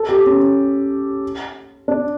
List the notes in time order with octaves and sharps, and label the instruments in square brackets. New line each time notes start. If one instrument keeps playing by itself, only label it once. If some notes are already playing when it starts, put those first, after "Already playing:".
Already playing: [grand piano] A4
G4
C#4
D4